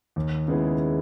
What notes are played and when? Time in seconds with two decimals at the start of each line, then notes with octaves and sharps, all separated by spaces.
0.16 D#2
0.48 C#3 G#3 B3 E4